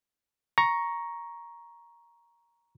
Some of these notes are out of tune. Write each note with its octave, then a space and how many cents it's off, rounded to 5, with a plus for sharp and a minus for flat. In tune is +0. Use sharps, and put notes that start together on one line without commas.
A#5 +10 C#6 +0